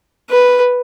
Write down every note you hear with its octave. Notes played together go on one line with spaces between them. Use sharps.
B4